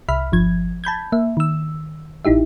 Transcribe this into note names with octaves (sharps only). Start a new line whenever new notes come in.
C2 E5 B5 F6
G1 F3 G#6
A5 B5 G6 G#6
A#3 E5
D#3 E6
A1 D#4 E4 G4 E5